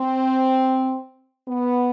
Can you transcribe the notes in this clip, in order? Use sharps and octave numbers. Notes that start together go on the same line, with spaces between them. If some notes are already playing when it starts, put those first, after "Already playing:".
Already playing: C4
B3